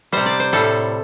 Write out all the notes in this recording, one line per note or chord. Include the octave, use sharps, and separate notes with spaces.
C3 G3 C5
D5
C5
A2 G3 A4